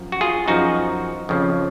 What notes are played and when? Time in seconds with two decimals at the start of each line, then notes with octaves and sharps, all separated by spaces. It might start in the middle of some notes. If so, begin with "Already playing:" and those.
Already playing: F#2 F3
0.12 F#4
0.21 F4 G#4
0.48 F#2 F3 D#4 F#4
1.29 F2 C#3 F3